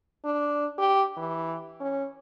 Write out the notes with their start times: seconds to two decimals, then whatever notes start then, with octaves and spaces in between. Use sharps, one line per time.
0.25 D4
0.78 G4
1.17 E3
1.80 C#4